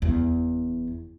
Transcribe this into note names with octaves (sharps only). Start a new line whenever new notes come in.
F#1 E2